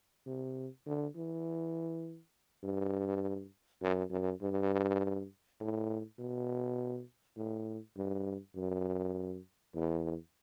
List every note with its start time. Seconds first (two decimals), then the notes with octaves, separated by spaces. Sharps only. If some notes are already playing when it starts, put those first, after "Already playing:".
0.26 C3
0.86 D3
1.16 E3
2.63 G2
3.82 F#2
4.12 F#2
4.42 G2
5.61 A2
6.19 B2
7.37 A2
7.96 G2
8.56 F#2
9.74 E2